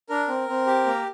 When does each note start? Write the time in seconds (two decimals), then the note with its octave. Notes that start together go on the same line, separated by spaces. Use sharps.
0.09 D4 A#4
0.28 C4
0.48 C4
0.67 G4
0.86 A#3